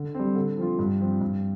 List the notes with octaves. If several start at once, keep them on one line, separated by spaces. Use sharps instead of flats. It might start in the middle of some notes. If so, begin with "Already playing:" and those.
Already playing: D3
G3 C4
D3
F3 C4 F4
G2
F3 C4
G2